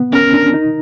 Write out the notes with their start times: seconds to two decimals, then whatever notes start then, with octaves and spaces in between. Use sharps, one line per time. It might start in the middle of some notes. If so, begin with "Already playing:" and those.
Already playing: B3
0.13 C#4 A#4
0.34 D4
0.54 D#4